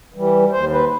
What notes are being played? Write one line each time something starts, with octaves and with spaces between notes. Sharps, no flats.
E3 G3
D#2 C5
B4